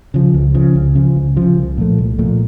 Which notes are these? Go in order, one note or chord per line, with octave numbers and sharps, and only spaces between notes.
C#3 F3
C#2
C#3 F3
C#2
C#3 F3
C#2
C#3 F3
C2
A#2 F3 A3
C2
A#2 F3 A3